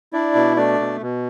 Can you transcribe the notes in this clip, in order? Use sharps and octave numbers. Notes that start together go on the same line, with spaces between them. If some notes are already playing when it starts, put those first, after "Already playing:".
D4 E4 D5
B2
A3 D4 D5
B2
B2